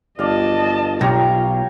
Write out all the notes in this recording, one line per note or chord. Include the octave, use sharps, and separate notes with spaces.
G1 D5 D#5 F5 A5
B1 F4 G4 C#5 A#5